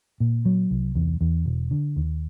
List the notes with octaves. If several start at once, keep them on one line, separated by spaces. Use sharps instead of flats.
A#2
F#3
C2
E2
E2
E1
D3
D#2